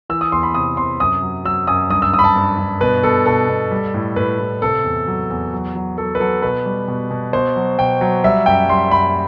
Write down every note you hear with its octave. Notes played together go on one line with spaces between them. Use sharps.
E3 E6
D#6
E2 C6
B5
C3 D#6
C3 C6
F#2 D#6
F#3
F#3 E6
F#2 D#6
G2 D#6
E6
G2 D#6
B5
A5
G2
G2
B2 B4
B2 A4
B2 A4
B2
G3
A2
A2 B4
A2
C3 A4
E2
F#3
E2
F#3
F#3
F#3 A4
B4
F#3 A4
B2 B4
G3
B2
B2
B2 C5
F#3
B2 G5
F#3
G3 E5
F#2 G5
G3 C6
F#2 B5